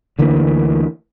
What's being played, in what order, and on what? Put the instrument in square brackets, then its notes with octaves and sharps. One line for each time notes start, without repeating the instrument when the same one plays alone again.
[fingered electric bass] D2 D3 E3 A#3